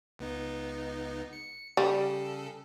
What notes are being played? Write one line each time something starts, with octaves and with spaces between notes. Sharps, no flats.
C#2 B3 D#4
C#7
C#3 G3 A4